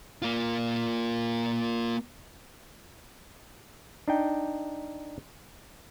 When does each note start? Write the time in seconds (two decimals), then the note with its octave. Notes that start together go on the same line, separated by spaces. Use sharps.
0.22 A#3 F4
4.08 D4 D#4 G5